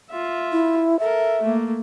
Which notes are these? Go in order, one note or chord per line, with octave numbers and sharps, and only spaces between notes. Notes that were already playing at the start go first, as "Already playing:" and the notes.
F4 E5
E4
A4 A#4 E5
A3 A#3